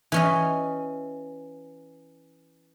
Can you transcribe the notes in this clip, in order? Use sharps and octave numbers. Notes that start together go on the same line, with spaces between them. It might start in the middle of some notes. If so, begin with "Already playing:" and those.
E3 C#4 D#5